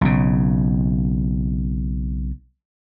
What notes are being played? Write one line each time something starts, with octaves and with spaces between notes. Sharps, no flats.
B1 C#3